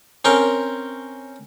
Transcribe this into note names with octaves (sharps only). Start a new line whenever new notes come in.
C4 C#4 A#4 G5